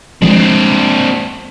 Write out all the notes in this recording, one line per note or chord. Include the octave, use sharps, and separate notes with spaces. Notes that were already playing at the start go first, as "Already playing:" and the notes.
F3 G#3 C4 D4